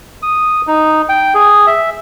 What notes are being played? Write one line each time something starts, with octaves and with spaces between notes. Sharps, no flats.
D#6
D#4
G5
G#4
E5